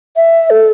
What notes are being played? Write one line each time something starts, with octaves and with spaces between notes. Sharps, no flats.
E5
A4